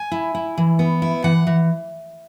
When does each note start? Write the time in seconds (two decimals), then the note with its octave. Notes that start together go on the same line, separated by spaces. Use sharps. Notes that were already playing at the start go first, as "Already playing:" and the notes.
Already playing: G#5
0.12 E4
0.35 E4
0.58 E3
0.79 B3
1.02 E4
1.24 E3 F#5
1.47 E3